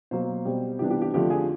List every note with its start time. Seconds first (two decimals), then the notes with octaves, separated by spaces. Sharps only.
0.11 B2 F#3 A#3 C5
0.45 B2 G3 C4
0.79 C3 E3 G3 B3 D4 G4
0.90 G4
1.02 G4
1.14 F2 D3 F3 A3 G4
1.30 G#4